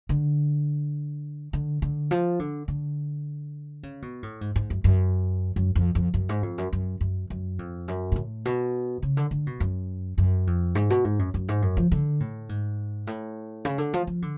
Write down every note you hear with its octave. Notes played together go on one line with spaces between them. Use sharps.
D3
D3
D3
F3
D3
D3
C#3
B2
A2
G#2
G#2
F#2
F#2
F#2
F2
F2
F#2
G#2
F2
F#2
F#2
F#2
F#2
F2
F#2
B2
A2
B2
C#3
D3
D3
B2
F#2
F#2
F2
G#2
B2
G#2
F#2
F#2
G#2
F#2
F3
D3
A2
G#2
A2
C#3
D3
F3
F3
D3